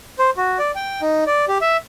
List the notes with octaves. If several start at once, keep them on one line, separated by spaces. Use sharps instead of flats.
C5
F#4
D5
G5
D#4
D5
G4
E5